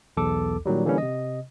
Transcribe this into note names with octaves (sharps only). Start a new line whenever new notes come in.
B1 E2 A4 D6
A#2 D#3 F#3 G3
D3 E3 G3 A#3 C#4
C3 D#5